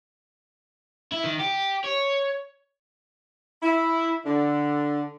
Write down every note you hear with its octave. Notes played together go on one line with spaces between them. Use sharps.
E4
D#3
G4
C#5
E4
D3